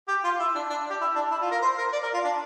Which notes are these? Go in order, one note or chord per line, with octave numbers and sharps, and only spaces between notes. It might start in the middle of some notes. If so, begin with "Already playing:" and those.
G4
F4
E4
D4
D4
G4
E4
D4
E4
F4
A#4
C5
A#4
D5
A#4
F4
D4